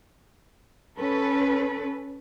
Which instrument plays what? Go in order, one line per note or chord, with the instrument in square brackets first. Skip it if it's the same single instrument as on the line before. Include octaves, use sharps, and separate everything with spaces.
[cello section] C#4 A4 B4